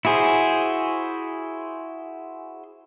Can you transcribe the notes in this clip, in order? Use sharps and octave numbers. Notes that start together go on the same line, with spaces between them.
E4 F#4 G#4 C5